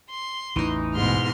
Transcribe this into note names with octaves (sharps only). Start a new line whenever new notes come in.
C6
A1 E2 E3 D#4
G#2 B2 C6 F6